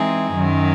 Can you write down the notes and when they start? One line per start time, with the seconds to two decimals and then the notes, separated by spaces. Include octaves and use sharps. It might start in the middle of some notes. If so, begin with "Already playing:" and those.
Already playing: E3 G#3 C4 D#4 G#4
0.33 F#2 D#3 F#3